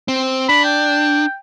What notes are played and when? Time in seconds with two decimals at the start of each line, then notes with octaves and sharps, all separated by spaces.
0.08 C4
0.49 D4 B5
0.65 G5